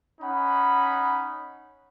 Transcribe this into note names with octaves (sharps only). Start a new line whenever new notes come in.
C#4 D#4 F#5 B5